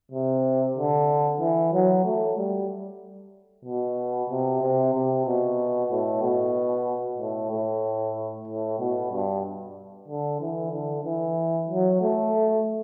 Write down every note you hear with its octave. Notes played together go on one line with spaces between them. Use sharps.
C3
D3
E3
F#3
A3
G3
B2
C3
C3
C3
B2
A2
B2
A2
A2
A2
B2
G2
D3
E3
D3
E3
F#3
A3